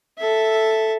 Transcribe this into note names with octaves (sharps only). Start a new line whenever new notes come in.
A4 E5